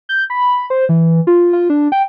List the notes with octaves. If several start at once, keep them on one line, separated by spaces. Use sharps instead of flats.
G6
B5
C5
E3
F4
F4
D4
G5